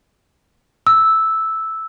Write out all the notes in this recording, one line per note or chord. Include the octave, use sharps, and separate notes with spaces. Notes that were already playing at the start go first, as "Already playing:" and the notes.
E6